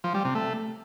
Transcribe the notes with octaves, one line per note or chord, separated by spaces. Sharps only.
F3
G3
C3
A3